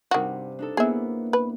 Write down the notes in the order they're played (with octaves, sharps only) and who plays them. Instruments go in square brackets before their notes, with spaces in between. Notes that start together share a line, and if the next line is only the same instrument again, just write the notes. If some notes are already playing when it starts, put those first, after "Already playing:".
[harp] G2 C3 D4 [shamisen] D#3 F#4
[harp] D4 D#4 A4
[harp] A#3 B3 E4 [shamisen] G#4 E5
[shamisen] B4